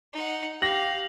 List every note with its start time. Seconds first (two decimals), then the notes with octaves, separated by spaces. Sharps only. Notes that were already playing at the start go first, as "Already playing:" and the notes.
0.13 D#4 F#5
0.62 G4 F5 A#6 F#7